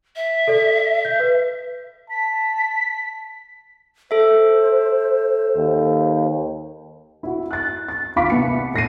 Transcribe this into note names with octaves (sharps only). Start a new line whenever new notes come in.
E5
A4 D5
G6
B4
A5 B6
A4 C5 E5
D#2
E4 F#4
F#6 A6
A6
D#2 F4 F5 B5 D6 B6
C2 B3 C#7
A2 A#6 C7 D#7